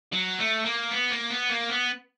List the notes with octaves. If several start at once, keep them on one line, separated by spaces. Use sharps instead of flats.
F#3
A3
A#3
B3
A#3
B3
A#3
B3